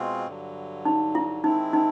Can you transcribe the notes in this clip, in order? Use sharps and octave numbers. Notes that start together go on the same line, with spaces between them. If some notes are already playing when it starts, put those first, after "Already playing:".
Already playing: B2 G#3 C4 F4
G2 D3 F#3
D#4
E4
D#3 G#3 C4 D#4 E4
D#4